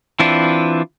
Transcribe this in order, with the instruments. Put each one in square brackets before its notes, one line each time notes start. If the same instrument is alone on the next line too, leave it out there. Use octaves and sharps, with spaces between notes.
[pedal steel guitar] E3 C4 D4 E4 F4